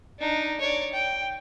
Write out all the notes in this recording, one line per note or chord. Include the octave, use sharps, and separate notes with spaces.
D4 D#4
C#5 D5
G5